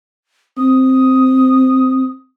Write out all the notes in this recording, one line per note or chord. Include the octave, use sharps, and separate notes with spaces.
C4 D#6